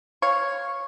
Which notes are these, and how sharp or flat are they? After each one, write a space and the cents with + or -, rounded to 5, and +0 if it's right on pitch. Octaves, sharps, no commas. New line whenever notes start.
C#5 -5 F5 +0